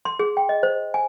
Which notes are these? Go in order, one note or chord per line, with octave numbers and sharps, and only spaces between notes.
C6
G#4
G5
D#5
C5
G#5